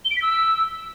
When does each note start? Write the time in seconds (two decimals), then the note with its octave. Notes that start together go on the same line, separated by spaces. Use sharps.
0.04 G7
0.10 D7
0.16 B6
0.22 E6